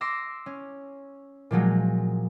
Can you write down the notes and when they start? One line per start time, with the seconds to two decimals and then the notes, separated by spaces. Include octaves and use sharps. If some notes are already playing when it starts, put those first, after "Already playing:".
0.01 C6 D6 E6 A#6
0.46 C#4
1.51 A#2 F3 F#3 G#3